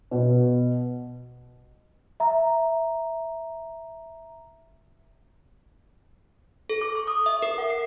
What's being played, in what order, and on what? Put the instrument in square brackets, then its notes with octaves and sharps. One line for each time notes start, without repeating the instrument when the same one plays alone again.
[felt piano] B2
[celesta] E5 A#5
[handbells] A4
D6
C#6
D#6
E5
A#4
F#5
C7